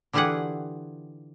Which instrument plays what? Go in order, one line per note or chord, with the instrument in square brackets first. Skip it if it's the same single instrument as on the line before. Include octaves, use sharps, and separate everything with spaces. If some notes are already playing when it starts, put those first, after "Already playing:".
[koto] D3 E3 F4 G4 G#4 F#5